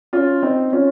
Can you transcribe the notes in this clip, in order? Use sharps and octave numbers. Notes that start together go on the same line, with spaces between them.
C#4 F4
C4 D#4
C#4 F4